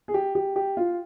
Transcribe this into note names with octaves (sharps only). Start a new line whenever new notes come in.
G#4
G4
G4
G4
F4